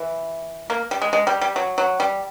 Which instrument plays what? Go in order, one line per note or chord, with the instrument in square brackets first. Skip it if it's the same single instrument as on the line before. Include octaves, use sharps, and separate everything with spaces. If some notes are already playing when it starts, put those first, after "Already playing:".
Already playing: [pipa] E3
A#3
G3
G#3
G#3
G3
G3
F#3
F#3
G3